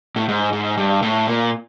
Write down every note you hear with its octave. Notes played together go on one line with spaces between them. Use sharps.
A2
G#2
G#2
G2
A2
A#2